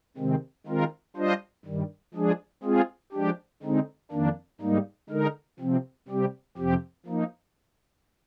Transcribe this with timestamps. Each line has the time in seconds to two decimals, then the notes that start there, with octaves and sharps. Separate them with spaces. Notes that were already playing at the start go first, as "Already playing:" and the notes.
0.17 C3 D#3 G#3 C4
0.67 D#3 G#3 C4 F4 A#4
1.16 G3 D4 F4 C5 D#5
1.65 G2 D#3 G3
2.14 F3 G#3 D4 G#4
2.63 G#3 C4 F4 G#4
3.13 F3 G#3 D4 G4
3.63 D3 G#3 C4 D#4
4.11 F2 D#3 A#3 D4
4.61 G#2 G3 A#3 D#4
5.09 D3 G#3 D#4 A#4
5.59 C3 F3 C4
6.08 C3 G3 C4 G4
6.57 F2 C3 F3 C4 G4
7.06 F3 A#3 D#4